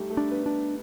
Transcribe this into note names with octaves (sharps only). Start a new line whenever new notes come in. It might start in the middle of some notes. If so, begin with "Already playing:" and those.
Already playing: G3 A3 D#4 G4 A4
A3 A4
D4
B3 B4
D4